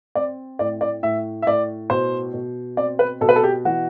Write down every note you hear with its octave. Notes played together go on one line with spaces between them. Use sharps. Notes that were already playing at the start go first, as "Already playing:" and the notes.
C4 D5
A2 D5
D5
A2 E5
E5
A2 D5
B2 C5
B2
C4 D5
B4
B2 A4
B4
A4
G4
E3 F#4